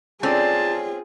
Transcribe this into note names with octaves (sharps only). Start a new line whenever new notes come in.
C4 C#4 F4 G#4 A4 D5 A5